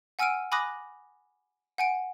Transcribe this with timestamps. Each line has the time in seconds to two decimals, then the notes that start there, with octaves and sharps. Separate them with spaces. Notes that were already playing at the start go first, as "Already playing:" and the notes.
0.19 F#5 G#5 E6 F6 D7 D#7
0.52 G#5 B5 D6 D#6 F#6 A#6
1.78 F#5 G#5 D7